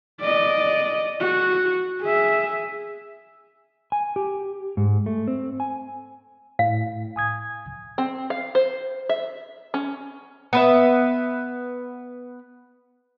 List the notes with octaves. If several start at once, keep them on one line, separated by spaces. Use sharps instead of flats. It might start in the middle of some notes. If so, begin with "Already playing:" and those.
D5 D#5
F#4
G#4 E5
G#5
G4
G#2
A3
C4
G#5
A2 F5
G#5 D#6 G#6
C4
F5
C5
E5
C#4
B3 B4 E5